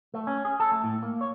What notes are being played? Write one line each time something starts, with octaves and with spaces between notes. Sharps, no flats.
A3
C#4
G#4
A4
A3
A2
A#3
C#5